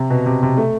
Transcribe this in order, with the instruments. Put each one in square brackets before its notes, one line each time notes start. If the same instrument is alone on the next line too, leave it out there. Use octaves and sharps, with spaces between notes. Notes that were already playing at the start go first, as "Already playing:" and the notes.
Already playing: [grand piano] C3
B2
C3
C3
A3